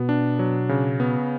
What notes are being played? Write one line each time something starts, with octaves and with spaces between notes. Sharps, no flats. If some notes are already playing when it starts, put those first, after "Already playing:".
Already playing: B2 B3
D4
F#3
C#3
B3